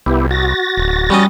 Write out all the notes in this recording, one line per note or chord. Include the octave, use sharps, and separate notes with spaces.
C2 B3 E4 G4
F#4 A6 A#6
D1
G3 C#4 D#5